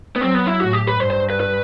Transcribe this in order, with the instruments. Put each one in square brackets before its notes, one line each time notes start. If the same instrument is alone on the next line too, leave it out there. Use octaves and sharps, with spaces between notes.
[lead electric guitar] B3
[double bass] F#3 [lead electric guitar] C4
[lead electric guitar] B3
E4
[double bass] A2 [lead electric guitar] F#4
[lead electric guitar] G4
B4
[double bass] G2 [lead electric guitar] C5
[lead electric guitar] C5
B4
B4